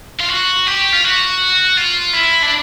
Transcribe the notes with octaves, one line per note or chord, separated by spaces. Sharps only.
F4
F#4
G4
F4
F#4
F4
E4
D4